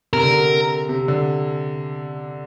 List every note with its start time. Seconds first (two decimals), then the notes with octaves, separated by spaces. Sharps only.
0.13 C3 A#4
0.23 D3
0.33 C3
0.89 C3
1.08 D3